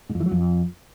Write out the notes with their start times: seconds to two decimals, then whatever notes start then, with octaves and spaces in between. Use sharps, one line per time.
0.09 G#2
0.15 F2
0.20 E3
0.26 F#3
0.31 F2